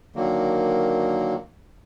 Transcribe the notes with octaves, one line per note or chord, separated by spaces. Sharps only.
D3 D#3 F#3 A#3